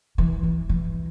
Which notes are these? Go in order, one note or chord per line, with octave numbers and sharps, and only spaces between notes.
E3
E3
E3